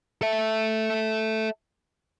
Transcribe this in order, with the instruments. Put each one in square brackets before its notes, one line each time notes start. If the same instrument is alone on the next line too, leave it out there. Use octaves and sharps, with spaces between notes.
[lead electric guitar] A4 E5